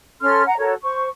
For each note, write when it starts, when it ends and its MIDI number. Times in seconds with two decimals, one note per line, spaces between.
0.21 0.43 61
0.21 0.43 69
0.21 0.43 84
0.21 0.43 89
0.46 0.55 78
0.46 0.55 82
0.58 0.74 66
0.58 0.74 69
0.58 0.74 70
0.58 0.74 73
0.82 1.07 72
0.82 1.07 85